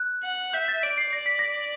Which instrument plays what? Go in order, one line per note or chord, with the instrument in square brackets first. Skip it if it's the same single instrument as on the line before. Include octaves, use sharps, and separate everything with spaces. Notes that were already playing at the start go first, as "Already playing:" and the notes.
Already playing: [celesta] F#6
[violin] F#5
[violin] E5 [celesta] G6
[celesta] A6
[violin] D5 [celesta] D7
[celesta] C7
[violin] D5 [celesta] A#6
[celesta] B6
A#6